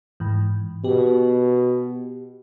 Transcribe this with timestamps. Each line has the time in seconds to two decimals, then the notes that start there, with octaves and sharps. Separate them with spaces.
0.20 G#2 E3
0.84 B2 G4